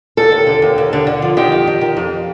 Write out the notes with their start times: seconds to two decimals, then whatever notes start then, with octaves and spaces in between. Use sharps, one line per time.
0.17 D#2 A4
0.32 D#2
0.47 D3
0.62 D#2
0.78 D#2
0.93 D3
1.07 D3
1.22 F3
1.37 D#3 G4
1.52 F2
1.67 D#3
1.81 D#3
1.97 F2